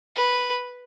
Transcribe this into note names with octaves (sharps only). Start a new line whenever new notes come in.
B4